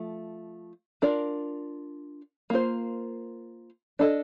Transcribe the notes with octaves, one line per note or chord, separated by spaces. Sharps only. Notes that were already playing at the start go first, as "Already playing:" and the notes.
Already playing: F3 A3
D4 F4 A#4 D5
A#3 F4 C5
D4 A4 D#5